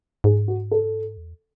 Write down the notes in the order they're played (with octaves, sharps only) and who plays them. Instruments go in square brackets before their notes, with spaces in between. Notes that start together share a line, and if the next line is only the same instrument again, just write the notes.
[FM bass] G#2 [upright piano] G#4
[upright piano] F#4
A4
[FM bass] E2